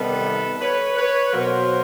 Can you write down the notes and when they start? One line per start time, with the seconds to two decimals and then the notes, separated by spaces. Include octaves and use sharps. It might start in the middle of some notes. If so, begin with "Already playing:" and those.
Already playing: C3 D#3 G3 B3 A4 B4
0.61 B4 C#5
0.97 B4 C#5
1.33 B2 F#3 A#3 A#4 C5